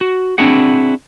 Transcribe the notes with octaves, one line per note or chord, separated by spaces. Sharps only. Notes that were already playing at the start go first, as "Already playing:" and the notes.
F#4
C4 D4 E4 F#4 G#4 F#5